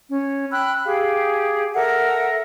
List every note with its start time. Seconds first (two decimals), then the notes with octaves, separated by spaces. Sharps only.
0.11 C#4
0.52 G5 B5 E6 F#6
0.85 G4 G#4 F5
1.74 A4 A#4 E5 F#5